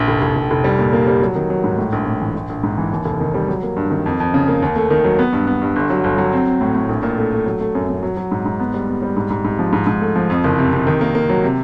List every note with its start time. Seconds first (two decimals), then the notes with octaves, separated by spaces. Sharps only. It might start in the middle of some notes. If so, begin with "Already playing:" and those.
Already playing: A#1
0.08 F1
0.22 F1
0.36 F1
0.51 F1
0.64 G3
0.79 A#2
0.93 A#3
1.07 G3
1.22 F#3
1.35 D#3
1.50 F#3
1.64 G#2
1.78 A2
1.92 A#1
2.07 A2
2.21 E3
2.35 A#1
2.49 A#1
2.63 G#2
2.78 E3
2.92 D#2
3.05 F1
3.20 D#3
3.34 G3
3.48 F#3
3.63 A#3
3.76 G2
3.91 D#3
4.06 F2
4.20 F2
4.34 C#3
4.48 A#3
4.62 D#2
4.76 A3
4.90 D#3
5.04 F#3
5.19 B3
5.33 G2
5.47 B3
5.62 G2
5.76 G1
5.90 F#3
6.04 G1
6.18 F#3
6.33 C4
6.46 C4
6.61 A2
6.75 A2
6.89 A#1
7.03 A#2
7.17 A3
7.32 A3
7.46 F#3
7.60 A3
7.75 F#2
7.89 F#2
8.03 F#3
8.17 F#3
8.32 G#2
8.45 G#2
8.60 B3
8.74 G3
8.88 B3
9.02 G3
9.17 G#2
9.30 G#2
9.45 G#2
9.59 F3
9.73 G#2
9.87 G#2
10.01 A3
10.15 F3
10.30 F2
10.44 F#1
10.59 C3
10.73 C3
10.87 D#3
11.01 A#3
11.15 A#3
11.29 F#3
11.44 C3